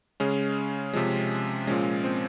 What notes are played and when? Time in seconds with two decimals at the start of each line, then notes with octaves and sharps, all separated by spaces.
0.20 C#3 G#3 C#4
0.93 C3 F3 G#3
1.67 A#2 F3 G#3 C#4
2.04 C4